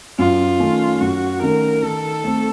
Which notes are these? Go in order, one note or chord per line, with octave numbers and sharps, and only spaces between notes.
F#2 F4
D#3 A3 C#4
F#2 F#4
D#3 A3 C#4 A#4
D#3 A4
A3 C4